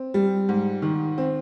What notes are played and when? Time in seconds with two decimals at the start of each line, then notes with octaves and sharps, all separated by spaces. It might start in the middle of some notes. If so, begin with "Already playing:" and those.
Already playing: C4
0.14 G3
0.49 G#2
0.82 D#3
1.18 C4